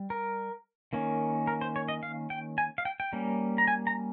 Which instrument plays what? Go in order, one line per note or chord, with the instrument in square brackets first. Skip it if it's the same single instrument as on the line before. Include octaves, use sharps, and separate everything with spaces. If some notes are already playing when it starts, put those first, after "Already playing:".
Already playing: [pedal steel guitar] G3
A#4
D#3 A#3 C#4
A#4
C5
C#5
D#5
F5
G5
G#5
F5
G5
G5
G3 A#3 C#4
A#5
G#5
A#5